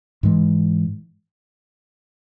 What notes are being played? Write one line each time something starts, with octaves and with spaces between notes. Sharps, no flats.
G#2 E3 G#3